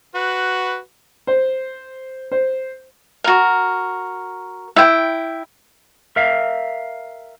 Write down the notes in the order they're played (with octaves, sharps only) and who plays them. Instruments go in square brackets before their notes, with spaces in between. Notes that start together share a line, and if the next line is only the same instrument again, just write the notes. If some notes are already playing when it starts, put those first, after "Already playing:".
[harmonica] F#4 B4
[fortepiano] C5
C5
[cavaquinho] F#4 A#4
E4 G5
[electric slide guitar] A#4 E5 F5